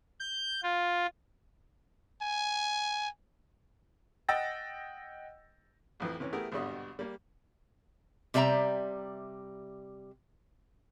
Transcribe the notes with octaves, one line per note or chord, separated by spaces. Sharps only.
G6
F4
G#5
D#5 F#5 G5 E6 A6 A#6
A1 F2 E3
C3 E3 C#4
A3 B3 E4 G4 G#4 A#4
G#1 G2 B2 D3 G3 D#5
G3 A#3
C3 G3 D5 E5 A#5